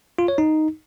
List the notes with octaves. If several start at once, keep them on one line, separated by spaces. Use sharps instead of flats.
F4
C#5
D#4